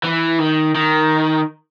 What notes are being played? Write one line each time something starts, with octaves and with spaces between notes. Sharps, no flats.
E3
D#3
D#3